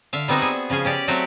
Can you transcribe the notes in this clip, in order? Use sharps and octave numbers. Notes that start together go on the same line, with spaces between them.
D3 E5 F5
G3 B3 C4 D#4 F#4
G#4 E5
C#3 F3 C#4 G#4
C#4 G4 D5
F#3 A3 C4 F#4 G4